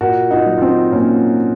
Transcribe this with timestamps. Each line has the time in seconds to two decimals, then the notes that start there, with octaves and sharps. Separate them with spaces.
0.01 A#2 F#4 A#4
0.31 D#4 F#4
0.46 F#3
0.58 F4
0.62 C4 D#4
0.92 A#2 A#3 C#4